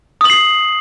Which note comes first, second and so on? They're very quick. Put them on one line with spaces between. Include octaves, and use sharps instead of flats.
D#6 F#7 C7